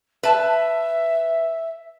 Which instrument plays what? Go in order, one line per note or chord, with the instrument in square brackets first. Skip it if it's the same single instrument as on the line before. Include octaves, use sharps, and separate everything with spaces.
[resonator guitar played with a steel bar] B4 A5 [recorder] E5